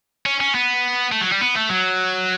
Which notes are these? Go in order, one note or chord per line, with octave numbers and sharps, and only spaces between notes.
C#4
C#4
B3
A3
F#3
G3
B3
A3
F#3